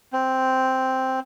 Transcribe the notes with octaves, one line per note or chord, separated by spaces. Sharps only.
C4